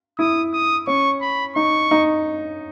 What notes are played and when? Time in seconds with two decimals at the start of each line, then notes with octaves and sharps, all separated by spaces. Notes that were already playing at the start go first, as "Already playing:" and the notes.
0.19 E4 D#6
0.53 D#6
0.87 C#4 C#6
1.21 B5
1.56 D#4 C#6
1.91 D#4